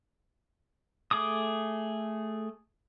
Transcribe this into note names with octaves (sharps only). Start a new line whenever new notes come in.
A3 G#4 D6 D#6